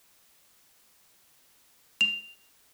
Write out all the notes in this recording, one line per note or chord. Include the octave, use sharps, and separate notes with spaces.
F7